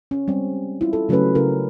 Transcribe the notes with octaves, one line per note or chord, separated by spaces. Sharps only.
C#4
G3 G#3 C4
E4 F4
A4
C#3 F#3 A3 C#4 B4
C#3 E4 A#4